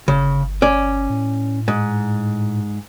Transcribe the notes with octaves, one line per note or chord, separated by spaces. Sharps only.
G1 C#3
C#4 D5
A2
G#2